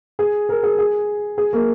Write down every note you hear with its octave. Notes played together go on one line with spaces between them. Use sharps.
G#4
A#4
G#4
G#4
G#4
A#3